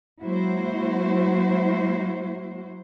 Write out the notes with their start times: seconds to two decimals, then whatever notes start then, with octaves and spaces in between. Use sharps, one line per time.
0.22 F#3 G#3 A#3 E4 F#4 C5